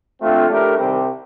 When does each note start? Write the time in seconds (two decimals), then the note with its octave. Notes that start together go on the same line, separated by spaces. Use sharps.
0.20 F2 D3 A3 C4 F4
0.48 A2 A3 D4 G4 A#4
0.77 C2 C3 D#3 G3 C4